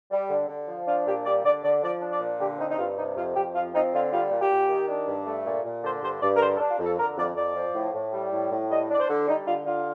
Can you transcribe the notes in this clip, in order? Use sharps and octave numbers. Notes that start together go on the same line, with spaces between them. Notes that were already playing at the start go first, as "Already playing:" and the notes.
G3
D3
D3
F3
D4 F4
A#2 G4
G3 D5
D3 D5
D3 D5
F3 D5
D4
D5
A#2
D3 G4
C4 D#4
D#4
G2 F4
C3 D#4
F2 F4
F2 G4
F3 F4
C4 D#4
D3 F4
G3 F4
A#2
G4
A#2
D#3
D4
G2
A3
A#2
A#2
D3 C5
G2 C5
G2 D5
A#4
D3 C5
A4
D4
F4
F2
A4
D3 A#4
F2 D5
F2 D5
F3
A2
A2
G3
A2
A2
G3 D#5
D4 D5
C5
D3
G3 D#4
D3 F4
D3 F4